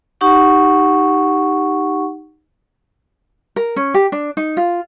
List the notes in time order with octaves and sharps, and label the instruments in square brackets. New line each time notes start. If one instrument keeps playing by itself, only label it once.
[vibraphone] D#4 G4 F#5 C#6
[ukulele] A#4
C#4
G4
D4
D#4
F4